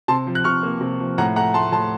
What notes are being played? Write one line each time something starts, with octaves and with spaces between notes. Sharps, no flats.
C3 A5 C6
F3
F#6
C3 C#6 F6
A#3
C3
F3
A2 F#5 A#5
A3 F#5 A#5
A3 A5 C6
A2 A5 C6